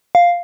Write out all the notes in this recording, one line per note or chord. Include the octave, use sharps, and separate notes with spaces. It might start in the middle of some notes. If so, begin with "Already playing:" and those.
F5